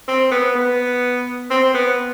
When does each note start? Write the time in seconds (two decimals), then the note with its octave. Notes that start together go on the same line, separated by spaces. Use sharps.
0.08 C4
0.32 B3
0.56 B3
1.51 C4
1.74 B3